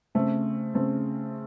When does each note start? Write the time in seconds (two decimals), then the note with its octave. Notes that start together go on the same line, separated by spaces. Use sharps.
0.15 C#3 A3 C4
0.74 C#3 A3 C4